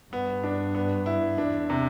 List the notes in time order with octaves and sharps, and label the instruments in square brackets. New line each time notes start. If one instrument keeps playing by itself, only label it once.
[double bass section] G2 [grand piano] B3
[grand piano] D4
B3
E4
[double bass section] E2 [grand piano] D4
[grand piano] C3